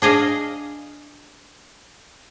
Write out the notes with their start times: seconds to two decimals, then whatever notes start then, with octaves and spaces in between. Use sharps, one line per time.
0.02 D4 G#4 D#5 F5